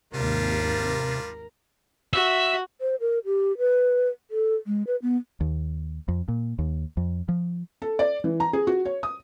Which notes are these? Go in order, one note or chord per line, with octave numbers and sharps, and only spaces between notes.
G#1 D#2 C3 G3 D4 F4 A#4
F#4 E5
C5
A#4
G4
B4
A4
G#3
B4
B3
D#2
F2
A#2
D#2
F2
F3
A4
D5
E3
A#5
G#4
F#4
C#5
D#6